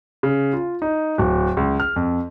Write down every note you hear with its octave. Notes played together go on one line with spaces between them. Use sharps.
C#3
F4
D#4
D1
C#2
F6
F2